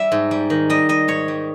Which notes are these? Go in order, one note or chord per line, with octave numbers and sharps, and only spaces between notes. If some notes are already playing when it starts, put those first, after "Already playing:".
Already playing: G3 E5
G#2
G3
D#3
G3 D#5
G3 D#5
G#2 C#5
G3